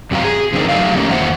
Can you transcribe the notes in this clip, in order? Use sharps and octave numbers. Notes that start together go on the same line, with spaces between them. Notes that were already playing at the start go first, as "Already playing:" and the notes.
F#2 C4 F#4 G4 F5 A#5
G#4
D3 F3 C4 D#4 A#4 D5
F#3 A3 D#4 G4 A4 F5
E3 A3 A#3 C#4
E2 D#3 A#3 C5 F#5